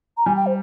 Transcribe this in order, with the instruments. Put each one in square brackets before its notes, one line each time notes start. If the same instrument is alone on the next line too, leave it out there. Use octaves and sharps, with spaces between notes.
[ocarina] A#5
[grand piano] G3 [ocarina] G#5
[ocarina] G5
C5